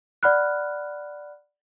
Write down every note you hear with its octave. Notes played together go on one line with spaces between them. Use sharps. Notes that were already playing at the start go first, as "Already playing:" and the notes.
D5 F#5 B5 F6 F#6